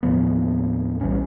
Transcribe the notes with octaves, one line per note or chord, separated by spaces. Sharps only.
D#2 A2 F3 B3
B1 E3 G3 C#4